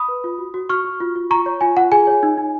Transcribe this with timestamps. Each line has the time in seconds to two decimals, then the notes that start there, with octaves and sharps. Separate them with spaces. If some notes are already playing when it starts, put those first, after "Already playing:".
Already playing: B5 D#6
0.08 B4
0.24 F4
0.39 F#4
0.54 F#4
0.69 F#4 C#6 F6
0.85 F#4
1.00 F4
1.15 F4
1.31 F4 A#5 C#6
1.46 C#5
1.61 F4 G#5
1.77 F4 F#5
1.92 G#4 G#5
2.07 C#5
2.23 D#4
2.38 D#4